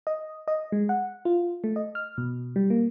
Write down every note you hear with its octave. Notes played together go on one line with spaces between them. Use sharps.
D#5
D#5
G#3
F#5
F4
A3
D#5
F6
B2
G3
A#3